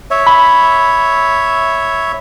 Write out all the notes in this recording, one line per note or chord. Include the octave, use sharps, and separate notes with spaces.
C#5 E5
B5